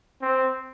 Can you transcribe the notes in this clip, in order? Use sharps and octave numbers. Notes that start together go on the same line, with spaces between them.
C4